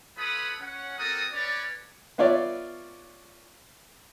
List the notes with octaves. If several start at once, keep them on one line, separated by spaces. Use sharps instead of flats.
F4 A4 B4 C#5 B5 D#6
C#4 F#5
A#3 C4 F#4 A4 A#4 D#6
C#4 B4 C#5 D5
B3 F4 C#5 D5 E5